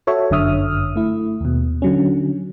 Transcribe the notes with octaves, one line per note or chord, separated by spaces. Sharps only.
F#4 A4 C#5 E5
G1 F#2 D3 E5 D#6 F6
A3 E4
D#2 B2
D3 F#3 C#4